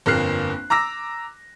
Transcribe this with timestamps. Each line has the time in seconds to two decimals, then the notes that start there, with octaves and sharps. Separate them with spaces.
0.06 G1 F2 A#3 F6 F#6 C7
0.70 A#5 D6 E6 A#6